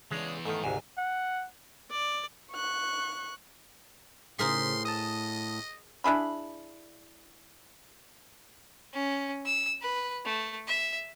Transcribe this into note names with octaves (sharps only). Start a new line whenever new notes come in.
C#3 E3 G#3 B3 D4
G#2 D#3 A3
G#1 D2 G#2 C3 G#5
F#5
D5
C#6 F#6
A2 C#3 G#4 A#4 C5 C6 B6
D#5 A5 D#6
D4 E4 G#4 B5
C#4
E6
B4
A3
E5